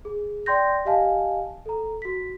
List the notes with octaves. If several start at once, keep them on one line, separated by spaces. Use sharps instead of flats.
G#4
D5 G5 C6 G6 A#6
G4 D#5 F5 G#5 A5
A4 A#5
F#4 B6